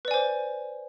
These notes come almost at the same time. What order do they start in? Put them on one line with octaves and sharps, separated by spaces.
B4 D5 G#5 C5